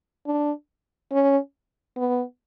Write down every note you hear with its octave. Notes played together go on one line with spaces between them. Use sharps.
D4
C#4
B3